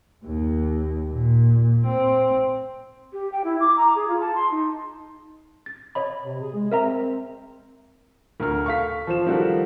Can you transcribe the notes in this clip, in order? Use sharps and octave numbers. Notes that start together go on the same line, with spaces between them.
D#2
A#2
C4
G4
G5
E4
D6
A#5
G#4
F4
A5
C6
D#4
A6
C#5 D#5 B5
C3
G#4
G#3
C4 A#4 E5 A#5
D2 A#4 F6
A4 F5 C#6 B6
F3 C5 A5 E7
D#3 F3 G3 F#4 A4